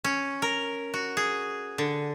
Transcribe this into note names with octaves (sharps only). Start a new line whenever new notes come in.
C#4
A#4
F#4
G#4
D3